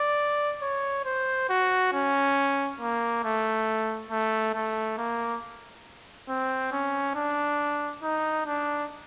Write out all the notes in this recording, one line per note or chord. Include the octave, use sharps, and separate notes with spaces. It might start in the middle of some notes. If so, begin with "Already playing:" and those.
Already playing: D5
C#5
C5
F#4
C#4
A#3
A3
A3
A3
A#3
C4
C#4
D4
D#4
D4